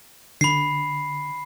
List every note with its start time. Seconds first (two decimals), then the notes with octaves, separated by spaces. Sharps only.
0.41 D3 B5 C7